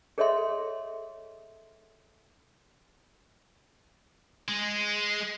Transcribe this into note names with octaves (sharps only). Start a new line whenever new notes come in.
G#4 A4 C#5 D#5 E5 C6
G#3